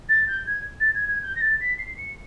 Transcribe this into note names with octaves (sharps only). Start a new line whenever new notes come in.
A6
G6
G#6
A6
G#6
G#6
G6
A#6
A6
B6
C7
C#7